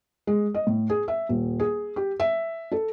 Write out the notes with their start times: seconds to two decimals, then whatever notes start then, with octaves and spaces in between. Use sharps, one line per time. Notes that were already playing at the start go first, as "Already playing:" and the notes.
0.27 G#3
0.54 D#5
0.67 A2
0.90 G#4
1.08 E5
1.29 D#1
1.60 G#4
1.96 G4
2.20 E5
2.72 A4